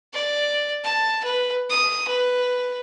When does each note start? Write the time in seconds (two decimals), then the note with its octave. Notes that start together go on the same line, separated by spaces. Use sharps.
0.13 D5
0.84 A5
1.24 B4
1.70 D#6
2.08 B4